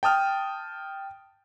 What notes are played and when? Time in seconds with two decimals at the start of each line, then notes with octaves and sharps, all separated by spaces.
0.03 G5 A5 D#6 F6